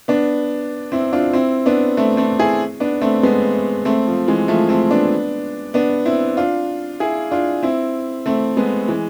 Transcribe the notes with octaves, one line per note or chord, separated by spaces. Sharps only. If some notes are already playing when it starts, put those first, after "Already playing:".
B3 D4
C4 E4
D4 F4
C4 E4
B3 D4
A3 C4
A3 C4
E4 G#4
B3 D4
A3 C4
G#3 B3
A3 C4
F3
E3 G#3
F3 A3
A3 C4
B3 D4
B3 D4
C4 E4
D4 F4
E4 G#4
D4 F4
C4 E4
A3 C4
G#3 B3
E3 G#3